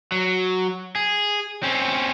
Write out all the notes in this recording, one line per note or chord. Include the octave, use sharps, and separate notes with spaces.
F#3
G#4
C4 C#4